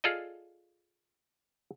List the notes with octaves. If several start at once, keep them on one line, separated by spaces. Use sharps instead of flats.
F4 G#4 A4 D5 D#5